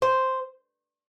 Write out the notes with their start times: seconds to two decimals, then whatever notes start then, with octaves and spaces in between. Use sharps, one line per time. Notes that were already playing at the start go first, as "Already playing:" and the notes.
0.02 C5